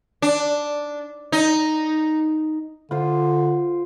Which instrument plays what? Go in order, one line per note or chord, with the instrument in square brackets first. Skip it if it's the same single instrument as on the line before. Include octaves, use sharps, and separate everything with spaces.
[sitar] D4
D#4
[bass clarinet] D3 [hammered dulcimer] F4 C5